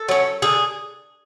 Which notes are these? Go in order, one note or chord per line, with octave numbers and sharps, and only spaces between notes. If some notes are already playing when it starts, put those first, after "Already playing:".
Already playing: A4
F#3 C#4
D3 G#4